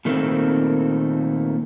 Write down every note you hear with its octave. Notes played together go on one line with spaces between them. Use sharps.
A#2 D#3 A3 A#3 C4